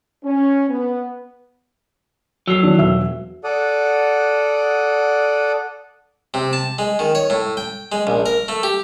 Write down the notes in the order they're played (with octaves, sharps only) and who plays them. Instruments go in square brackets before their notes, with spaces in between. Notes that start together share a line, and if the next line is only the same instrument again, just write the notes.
[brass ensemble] C#4
B3
[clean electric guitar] F#3 [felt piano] E6 C7
[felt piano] D#3 E3 D4
E1 E5 E6
[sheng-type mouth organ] A4 D5 F#5 D#6
[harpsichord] C3
A5
G#3
D#3
C#5
A2
G5
G#3
A#1
A#4
A3
G4